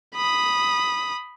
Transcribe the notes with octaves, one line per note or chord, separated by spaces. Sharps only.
B5 D#6